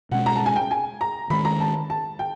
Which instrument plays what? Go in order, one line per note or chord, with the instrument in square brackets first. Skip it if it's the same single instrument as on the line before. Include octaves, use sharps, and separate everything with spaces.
[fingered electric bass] B2 G#3 C#4 [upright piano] F#5
[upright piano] A#5
A5
G#5
G5
G#5
A#5
[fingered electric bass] D#3 G#3 C#4 [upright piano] B5
[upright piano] A#5
A5
A5
G5